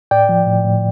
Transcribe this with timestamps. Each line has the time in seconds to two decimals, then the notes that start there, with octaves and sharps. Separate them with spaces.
0.11 A2 D5 G5
0.29 F3
0.47 A2
0.64 A2